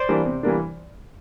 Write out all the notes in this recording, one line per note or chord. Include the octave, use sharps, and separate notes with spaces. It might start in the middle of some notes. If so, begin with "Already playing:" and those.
Already playing: C5 D5
E3 G3 A#3 D4
C3
E3 G3 A#3 D4